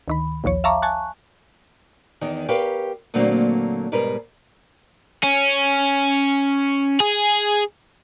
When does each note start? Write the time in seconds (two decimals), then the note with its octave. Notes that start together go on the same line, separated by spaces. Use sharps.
0.08 D2 D#3 B5
0.44 A#1 D#2 F3 C#5
0.64 E5 F5 A5 A#5 C#6 D6
0.82 G#5 A5 C#6 F#6
2.21 E2 D#3
2.48 G4 A#4 B4 C#5 F5 G5
3.14 A#2 D3 F#3 A3 A#3 C4
3.92 G#2 B2 G3 A#4 B4
5.23 C#4
7.00 G#4